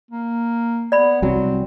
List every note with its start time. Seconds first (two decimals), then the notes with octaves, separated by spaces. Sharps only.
0.11 A#3
0.92 B3 D5 B5
1.22 C2 F#3 C4